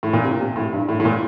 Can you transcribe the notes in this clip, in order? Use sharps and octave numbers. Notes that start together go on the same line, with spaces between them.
A2
A#2
C3
C3
A2
G2
A2
A2
A#2